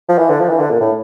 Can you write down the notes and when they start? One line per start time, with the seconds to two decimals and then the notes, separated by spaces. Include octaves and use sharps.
0.09 F3
0.18 E3
0.30 D3
0.40 F3
0.49 E3
0.60 D3
0.71 A#2
0.80 A2